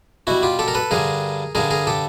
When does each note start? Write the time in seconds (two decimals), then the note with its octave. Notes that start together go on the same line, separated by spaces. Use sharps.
0.27 B2 G3 E4 F#4
0.43 F4 G4
0.59 G4 A4
0.68 A#4
0.75 A4 B4
0.91 G2 D3 G3 G#4 A#4
1.55 G2 D3 G3 G#4 A#4
1.70 G#4 A#4
1.87 G4 A4